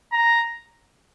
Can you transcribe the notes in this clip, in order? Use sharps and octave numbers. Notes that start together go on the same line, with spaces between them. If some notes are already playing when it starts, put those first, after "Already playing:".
A#5